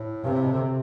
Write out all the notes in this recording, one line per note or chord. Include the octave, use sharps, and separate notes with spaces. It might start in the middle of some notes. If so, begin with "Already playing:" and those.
Already playing: A2
G2 C3
A2
B2
D3
C3